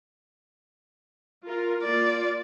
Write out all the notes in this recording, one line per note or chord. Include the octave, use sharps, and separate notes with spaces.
F4 A#4
A#3 F4 D5